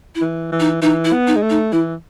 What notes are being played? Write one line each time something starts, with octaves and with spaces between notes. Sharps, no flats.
E4
E3
E3
D#4
E3 D#4
E4
B3
D#4
G#3
A3
D#4
E3 E4